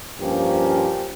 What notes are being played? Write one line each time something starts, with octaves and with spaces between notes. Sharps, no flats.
G2 F3 A#3 C#4 G4